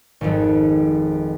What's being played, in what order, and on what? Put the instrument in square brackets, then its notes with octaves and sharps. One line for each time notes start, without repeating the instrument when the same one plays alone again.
[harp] G#1 F2